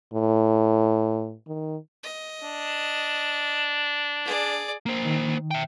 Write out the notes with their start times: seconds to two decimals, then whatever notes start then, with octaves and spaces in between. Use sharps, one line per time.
0.14 A2
1.47 D#3
2.03 D#5
2.43 D4
4.25 G#4 D5
4.86 A#3 C5
5.05 D#3
5.51 E5 G5